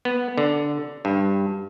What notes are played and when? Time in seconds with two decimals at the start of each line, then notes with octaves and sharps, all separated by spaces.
0.05 B3
0.38 D3
1.05 G2